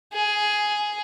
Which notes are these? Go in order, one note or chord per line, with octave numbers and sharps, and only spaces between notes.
G#4